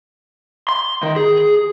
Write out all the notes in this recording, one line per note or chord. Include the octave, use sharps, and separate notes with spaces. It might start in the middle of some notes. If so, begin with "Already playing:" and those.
C6
D#3
G#4